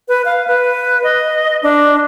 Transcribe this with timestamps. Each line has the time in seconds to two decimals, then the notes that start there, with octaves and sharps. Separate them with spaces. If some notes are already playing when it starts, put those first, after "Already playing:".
0.08 B4
0.25 F5
0.47 B4
1.04 D#5
1.63 D4